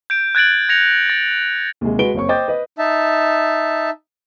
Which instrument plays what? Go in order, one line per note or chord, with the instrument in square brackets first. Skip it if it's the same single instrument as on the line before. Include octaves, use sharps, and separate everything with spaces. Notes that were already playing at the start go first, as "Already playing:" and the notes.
[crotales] G6 D7
F#6 G#6 A6 D7 F#7
G#6 A#6 C#7 F7
A6
[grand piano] D#2 C3 G#3
G#3 F#4 B4 D7 G7
F#1 C4 C#5 C#6
C5 D#5 G5 D6 G6 A6
B4 D#5
[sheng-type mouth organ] D#4 E5 A5